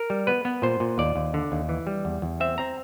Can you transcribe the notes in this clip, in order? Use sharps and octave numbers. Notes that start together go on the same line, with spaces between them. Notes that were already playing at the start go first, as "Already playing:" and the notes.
Already playing: A#4
G3
B3 B4
B3
A#2 C5
A#2
D#2 D5
D#2
D3
D#2
E3
G3
E2
E2
C4 E5
C4 A#5